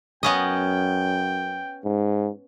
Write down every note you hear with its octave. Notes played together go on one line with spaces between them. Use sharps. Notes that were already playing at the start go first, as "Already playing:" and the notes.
F#2 B3 C#4 D#5 G5
G#2